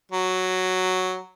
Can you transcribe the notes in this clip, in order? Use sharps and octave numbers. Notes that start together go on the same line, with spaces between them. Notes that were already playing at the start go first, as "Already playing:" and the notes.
F#3